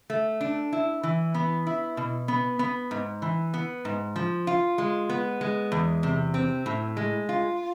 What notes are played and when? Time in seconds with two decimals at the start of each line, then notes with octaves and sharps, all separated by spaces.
0.10 A3
0.41 D4
0.73 E4
1.03 E3
1.34 B3
1.67 E4
1.97 B2
2.28 B3
2.59 B3
2.91 G#2
3.22 E3
3.54 B3
3.85 G#2
4.16 F3
4.47 F4
4.78 G#3
5.09 B3
5.41 G#3
5.72 E2
6.03 C3
6.34 C4
6.66 A2
6.97 G#3
7.29 F4